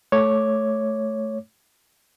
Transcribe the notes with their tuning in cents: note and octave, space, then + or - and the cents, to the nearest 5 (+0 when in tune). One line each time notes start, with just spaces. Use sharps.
A3 -10 C#5 +0 D6 +0